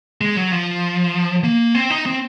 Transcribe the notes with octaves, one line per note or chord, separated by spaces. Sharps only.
G#3
F#3
F3
A#3
C4
D#4
C4